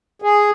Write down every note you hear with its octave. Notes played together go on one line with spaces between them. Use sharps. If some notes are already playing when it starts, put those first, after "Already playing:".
G#4